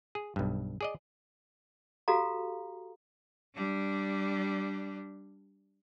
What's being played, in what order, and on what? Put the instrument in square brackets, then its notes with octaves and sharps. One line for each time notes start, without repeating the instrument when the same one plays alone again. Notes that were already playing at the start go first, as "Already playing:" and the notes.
[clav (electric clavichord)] G#4
B1 G2
G#4 D5 D#5
[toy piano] F#4 G4 A4 F5 A#5
[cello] G3 D4